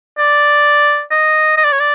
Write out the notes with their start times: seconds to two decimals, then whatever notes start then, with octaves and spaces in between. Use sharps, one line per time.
0.18 D5
1.11 D#5
1.57 D#5
1.64 D5
1.72 C#5
1.80 D5